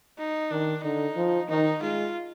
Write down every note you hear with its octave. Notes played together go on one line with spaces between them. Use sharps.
D#4
D#3 D4
D3 D#4
F3
D#3 D#4
G#3 F4